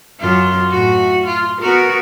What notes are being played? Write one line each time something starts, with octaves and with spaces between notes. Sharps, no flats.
F#2 F4
A2 F#4
F4
B3 F#4 A#4